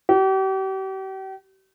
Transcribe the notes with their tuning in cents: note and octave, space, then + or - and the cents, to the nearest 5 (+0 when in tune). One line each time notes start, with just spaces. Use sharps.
G4 -40